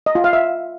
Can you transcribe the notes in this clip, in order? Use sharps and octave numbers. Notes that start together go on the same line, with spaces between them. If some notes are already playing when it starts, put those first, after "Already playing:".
D#5
F4
F5
E5